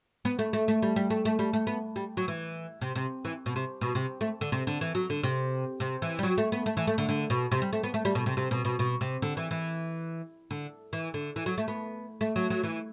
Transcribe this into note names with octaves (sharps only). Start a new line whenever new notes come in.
B3
A3
A3
A3
G3
G3
A3
A3
G3
A3
B3
G3
F#3
E3
C3
C3
E3
B2
C3
B2
C3
A3
D3
C3
D3
E3
F#3
D3
C3
C3
E3
G3
F#3
A3
B3
A3
E3
A3
D3
D3
B2
C3
G3
A3
B3
A3
G3
B2
C3
C3
B2
B2
B2
C3
D3
E3
E3
D3
E3
D3
E3
F#3
A3
B3
A3
F#3
F#3
E3